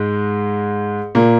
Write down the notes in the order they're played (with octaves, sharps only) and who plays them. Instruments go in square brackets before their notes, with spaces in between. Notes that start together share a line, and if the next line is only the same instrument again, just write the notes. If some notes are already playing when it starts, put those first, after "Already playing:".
Already playing: [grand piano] G#2 G#3
A#2 A#3